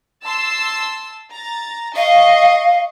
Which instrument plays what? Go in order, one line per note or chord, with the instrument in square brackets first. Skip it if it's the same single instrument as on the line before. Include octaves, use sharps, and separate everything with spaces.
[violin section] A5 C6 E6
A#5 A6
[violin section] D#5 C#6 [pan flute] F5